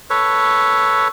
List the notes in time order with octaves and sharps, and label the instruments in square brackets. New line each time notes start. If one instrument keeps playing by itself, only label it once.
[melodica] A4 B4 C#5